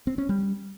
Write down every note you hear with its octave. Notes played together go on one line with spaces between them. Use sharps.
C4
C#4
G3